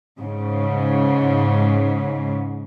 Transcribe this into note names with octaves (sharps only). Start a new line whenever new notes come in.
G#2 C#3